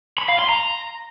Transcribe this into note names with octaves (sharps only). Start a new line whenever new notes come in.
B5
F5
C6
A#5